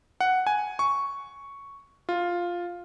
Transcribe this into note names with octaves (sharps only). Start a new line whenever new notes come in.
F#5
G#5
C#6
F4